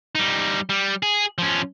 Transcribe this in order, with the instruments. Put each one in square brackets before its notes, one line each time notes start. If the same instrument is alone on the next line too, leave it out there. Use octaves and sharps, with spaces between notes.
[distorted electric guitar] G3 D#4
G3
G#4
F3 C#4